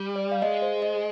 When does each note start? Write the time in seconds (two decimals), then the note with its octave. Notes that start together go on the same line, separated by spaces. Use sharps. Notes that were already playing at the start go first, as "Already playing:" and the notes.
Already playing: G3
0.16 D5
0.32 F5
0.42 G#3 D#5
0.62 C5
0.82 D#5